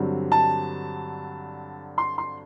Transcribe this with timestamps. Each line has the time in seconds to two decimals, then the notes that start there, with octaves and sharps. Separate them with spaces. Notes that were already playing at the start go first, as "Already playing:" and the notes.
Already playing: G2 D3 F#3 C4
0.32 A5
1.98 C6
2.18 C6